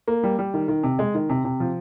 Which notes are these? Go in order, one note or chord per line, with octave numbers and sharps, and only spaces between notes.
A#3
G3
G3
D#3
D#3
C3
G#3
D#3
C3
C3
F3